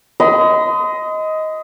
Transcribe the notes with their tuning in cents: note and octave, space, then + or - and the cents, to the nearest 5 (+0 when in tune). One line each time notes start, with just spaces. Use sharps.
D#5 +15 C6 -40